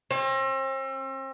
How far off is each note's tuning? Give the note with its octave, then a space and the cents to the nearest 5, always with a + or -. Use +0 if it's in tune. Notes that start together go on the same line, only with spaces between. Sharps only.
C4 +40